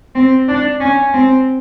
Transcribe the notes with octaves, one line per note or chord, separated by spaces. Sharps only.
C4
D4
C#4
C4